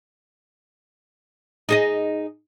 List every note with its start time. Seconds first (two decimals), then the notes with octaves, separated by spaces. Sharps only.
1.69 D#4 G#4 D#5